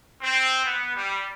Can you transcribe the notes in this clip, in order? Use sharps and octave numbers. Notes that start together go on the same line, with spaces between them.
C4
B3
G3